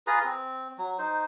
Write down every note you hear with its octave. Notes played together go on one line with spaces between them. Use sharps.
F4 G#4 B4 A#5
C4
F#3
D#4 C5